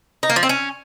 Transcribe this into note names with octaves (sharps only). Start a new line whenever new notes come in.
D#4
A#3
F3
C4
C#4